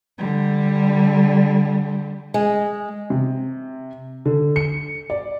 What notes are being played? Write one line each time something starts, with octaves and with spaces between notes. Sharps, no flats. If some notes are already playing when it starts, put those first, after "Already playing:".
D3 G3
G#3
C3
D3
C#7
D5